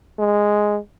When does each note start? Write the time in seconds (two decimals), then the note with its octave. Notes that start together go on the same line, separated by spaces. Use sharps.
0.19 G#3